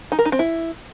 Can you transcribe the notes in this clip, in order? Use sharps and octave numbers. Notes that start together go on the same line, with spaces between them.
D#4
A#4
D#4
C4
E4